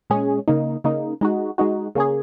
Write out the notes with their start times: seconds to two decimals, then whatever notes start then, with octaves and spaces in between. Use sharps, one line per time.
0.10 A#2 G#3 C#4 G#4
0.48 C#3 A#3 D#4
0.84 C#3 A#3 D#4
1.21 G#3 D#4 F#4
1.58 G#3 D#4 F#4
1.95 C#3 A#3 C#4 G#4